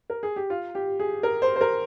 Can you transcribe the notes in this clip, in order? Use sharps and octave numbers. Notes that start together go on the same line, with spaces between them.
A#4
G#4
G4
F4
G4
G#4
A#4
C5
C5
A#4